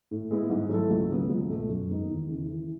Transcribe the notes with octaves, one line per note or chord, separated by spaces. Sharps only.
A2
G#3 B3 E4
G#2
F#3 A3 E4 A4
C#2
C#3 F#3 B3
C#2
B2 A3
F#2
D#3 G#3 B3 D#4
E2
C#3 E3
E3